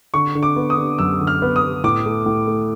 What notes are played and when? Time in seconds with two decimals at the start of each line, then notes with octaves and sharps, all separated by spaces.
0.14 D3 C#6
0.35 D3
0.43 D6
0.56 B3
0.70 D#6
0.77 D3
0.98 F#2 E6
1.21 D3
1.27 F6
1.42 B3
1.56 D#6
1.62 B3
1.84 A2 D6
2.05 A3
2.26 A2
2.47 A3